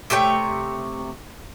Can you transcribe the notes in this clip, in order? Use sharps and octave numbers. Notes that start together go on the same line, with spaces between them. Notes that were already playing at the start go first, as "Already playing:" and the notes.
C3 A3 C#5 G5